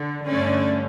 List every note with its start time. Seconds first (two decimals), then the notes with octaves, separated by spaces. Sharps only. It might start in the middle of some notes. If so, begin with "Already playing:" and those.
Already playing: D3
0.27 G2 D3 A3 C#4 D5